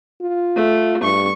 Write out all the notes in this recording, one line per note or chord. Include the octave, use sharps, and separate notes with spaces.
F4
A3
G2 C#6